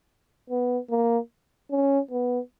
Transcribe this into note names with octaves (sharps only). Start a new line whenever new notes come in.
B3
A#3
C#4
B3